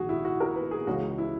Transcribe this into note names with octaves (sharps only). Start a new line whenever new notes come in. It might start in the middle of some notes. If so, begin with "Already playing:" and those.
Already playing: A#1 G#2 D#3 F#4 G#4
E4
F#4
A#4
B4
G#4
C#2 C#3 E3 F#4
E4